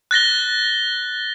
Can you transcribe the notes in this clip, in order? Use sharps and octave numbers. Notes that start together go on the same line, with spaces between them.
F#6 A6 A#6 G7